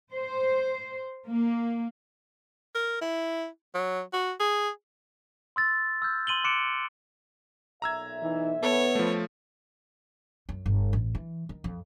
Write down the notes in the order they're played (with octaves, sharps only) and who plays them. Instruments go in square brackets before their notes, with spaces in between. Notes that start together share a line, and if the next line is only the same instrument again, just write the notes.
[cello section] C5
A#3
[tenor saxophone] A#4
E4
F#3
F#4
G#4
[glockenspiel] C6 E6 A6
E6 F6 G6
C6 D#7 F#7 G7
C6 D6 F#6 C#7 D7 E7
[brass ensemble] B1 A#2 E5 [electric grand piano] A#5 E6 G#6
[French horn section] E3 D#4
[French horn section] B3 [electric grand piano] A4 [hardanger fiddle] C#5
[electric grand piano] F3 A3
[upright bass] F#2
G1
A1
E3
D#3
F2